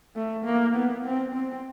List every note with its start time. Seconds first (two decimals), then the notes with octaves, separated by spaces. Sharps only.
0.16 A3
0.45 A#3
0.76 B3
1.05 C4
1.35 C4